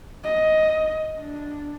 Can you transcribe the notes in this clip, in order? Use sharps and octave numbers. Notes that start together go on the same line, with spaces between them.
D#5
D4